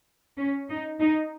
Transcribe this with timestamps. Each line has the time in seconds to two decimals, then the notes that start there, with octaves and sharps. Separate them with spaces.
0.38 C#4
0.70 D#4
1.01 D#4